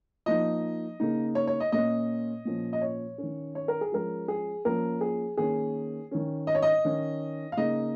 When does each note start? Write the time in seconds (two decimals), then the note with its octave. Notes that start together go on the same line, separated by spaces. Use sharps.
0.26 F3 A#3 D#4 D#5
1.00 C#3 A#3 D#4
1.35 C#5
1.47 C#5
1.60 D#5
1.72 A#2 A#3 C#4 D#5
2.45 A#2 F3 C#4
2.73 D#5
2.82 C#5
3.18 C#4
3.23 D#3
3.55 C#5
3.68 A#4
3.81 G#4
3.92 F3 G#3 C#4 A#4
4.28 G#4
4.65 F3 A#3 C#4 A#4
5.01 G#4
5.37 D#3 A#3 C#4 G#4
6.11 D#3 C#4
6.47 D#5
6.55 C#5
6.62 D#5
6.85 D#3 C#4
7.52 F5
7.57 C#3 A#3 D#4 D#5